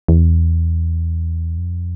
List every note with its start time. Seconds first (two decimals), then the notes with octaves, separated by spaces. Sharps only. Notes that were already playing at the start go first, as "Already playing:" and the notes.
0.08 E2
1.58 F2